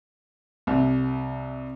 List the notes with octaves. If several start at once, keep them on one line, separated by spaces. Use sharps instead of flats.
C2 C3